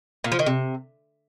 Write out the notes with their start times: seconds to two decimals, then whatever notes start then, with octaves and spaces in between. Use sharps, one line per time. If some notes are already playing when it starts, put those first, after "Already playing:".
0.24 A#2
0.32 F3
0.39 D#3
0.46 C3